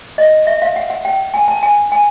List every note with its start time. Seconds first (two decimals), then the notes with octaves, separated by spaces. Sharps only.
0.18 D#5
0.47 E5
0.62 F5
0.76 F#5
0.90 F#5
1.05 G5
1.34 G#5
1.48 A5
1.63 G#5
1.92 G#5